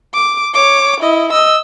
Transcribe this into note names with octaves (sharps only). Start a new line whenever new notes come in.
D6
C#5 D6
E4 D#5
D#5 E6